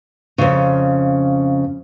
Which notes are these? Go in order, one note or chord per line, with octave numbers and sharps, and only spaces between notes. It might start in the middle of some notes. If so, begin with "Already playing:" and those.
F2 C#3